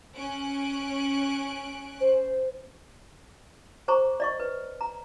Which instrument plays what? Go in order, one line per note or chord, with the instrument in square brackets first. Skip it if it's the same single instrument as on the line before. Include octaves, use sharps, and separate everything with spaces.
[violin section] C#4 F#6 D7
[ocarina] C5
[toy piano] G#4 C5 A#5 C#6
D5 D#5 C#6
B4
A#5